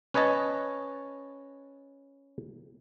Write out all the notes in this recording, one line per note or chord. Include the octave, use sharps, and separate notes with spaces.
C#4 B4 C#5 D#5 A5